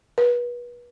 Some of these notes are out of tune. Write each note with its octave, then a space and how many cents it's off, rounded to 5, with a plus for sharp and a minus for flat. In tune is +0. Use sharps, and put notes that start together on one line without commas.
B4 -30